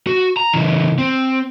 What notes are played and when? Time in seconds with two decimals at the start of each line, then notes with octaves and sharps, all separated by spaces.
0.07 F#4
0.37 A#5
0.53 C#3 E3
0.98 C4